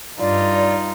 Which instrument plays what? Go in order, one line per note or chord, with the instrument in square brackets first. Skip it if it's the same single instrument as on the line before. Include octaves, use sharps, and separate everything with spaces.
[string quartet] G2 D#4 F4 [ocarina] D5